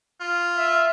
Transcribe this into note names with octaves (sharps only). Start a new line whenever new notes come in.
F4
E5